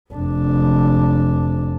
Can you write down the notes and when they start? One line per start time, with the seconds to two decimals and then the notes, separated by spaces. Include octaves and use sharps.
0.12 F1 D4